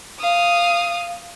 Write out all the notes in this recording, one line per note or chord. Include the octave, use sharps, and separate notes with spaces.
F5 D#6